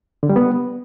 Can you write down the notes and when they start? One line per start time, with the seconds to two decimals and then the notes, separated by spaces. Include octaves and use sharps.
0.23 D3
0.29 G3
0.36 B3